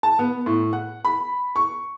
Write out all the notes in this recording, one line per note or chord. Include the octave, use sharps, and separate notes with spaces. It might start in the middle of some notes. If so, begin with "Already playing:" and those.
A5
B3
A2
F#5
B5
C#6